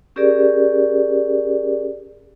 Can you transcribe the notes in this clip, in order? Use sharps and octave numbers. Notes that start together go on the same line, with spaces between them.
C#4 G4 G#4 A#4 D5